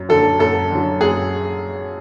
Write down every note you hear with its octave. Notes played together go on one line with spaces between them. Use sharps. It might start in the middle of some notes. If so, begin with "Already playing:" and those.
Already playing: F#2
D3 F#3 A4
F#2 A4
D3 F#3
F#2 G#4